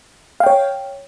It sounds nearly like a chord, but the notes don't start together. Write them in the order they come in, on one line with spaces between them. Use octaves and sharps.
F5 G5 C#5